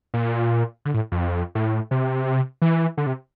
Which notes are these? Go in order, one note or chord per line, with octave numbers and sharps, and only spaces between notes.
A#2
D3
A2
F2
A2
C3
E3
D3
C3